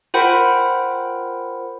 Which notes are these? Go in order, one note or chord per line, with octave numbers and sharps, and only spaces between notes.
F4 A#4 C5 F#5 G5 B5